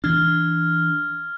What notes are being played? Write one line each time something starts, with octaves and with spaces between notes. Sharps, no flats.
E3 D4 F6 G#6